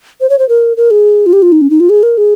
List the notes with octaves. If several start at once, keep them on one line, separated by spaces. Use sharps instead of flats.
C5
C#5
C5
A#4
A#4
G#4
F4
G4
F4
D#4
C#4
D#4
F4
G#4
A#4
G#4